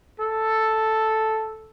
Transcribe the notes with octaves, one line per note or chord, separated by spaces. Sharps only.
A4